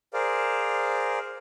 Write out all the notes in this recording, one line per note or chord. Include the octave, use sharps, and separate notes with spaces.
G#4 A#4 C5 D5 F5